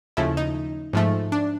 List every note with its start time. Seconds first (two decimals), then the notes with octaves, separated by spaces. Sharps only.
0.17 D#2 C#3 F3 A3 E4
0.37 D#4
0.93 G#2 F3 A3
1.32 D4